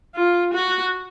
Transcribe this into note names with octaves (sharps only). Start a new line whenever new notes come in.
F4
F#4